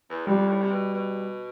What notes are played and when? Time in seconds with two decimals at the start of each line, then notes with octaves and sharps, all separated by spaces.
0.10 E2
0.27 F2 G3
0.49 A2
0.61 C3
0.71 B2
0.94 B2